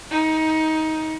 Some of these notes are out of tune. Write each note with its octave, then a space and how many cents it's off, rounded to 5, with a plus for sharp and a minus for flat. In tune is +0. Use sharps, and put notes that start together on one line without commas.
D#4 +20